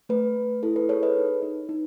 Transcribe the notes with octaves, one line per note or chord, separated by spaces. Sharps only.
A3 B4
A3
E4 A4
B4
G#4 A4 C#5
B4 D#5
D#4
D#4
D#4